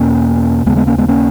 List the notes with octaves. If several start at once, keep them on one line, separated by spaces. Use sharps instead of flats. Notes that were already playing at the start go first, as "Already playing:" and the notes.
Already playing: E2 B2 A#3 C#4
D#2 C#3 G#3 B3
G#3 B3
A#3 C#4
G#3 B3
A#3 C#4